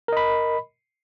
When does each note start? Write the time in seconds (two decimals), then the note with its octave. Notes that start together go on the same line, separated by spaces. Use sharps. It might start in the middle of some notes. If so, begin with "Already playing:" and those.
0.08 A#4
0.13 D#5
0.17 B5